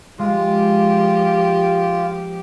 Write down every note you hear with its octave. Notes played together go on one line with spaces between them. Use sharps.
F3 G#3 F4 G4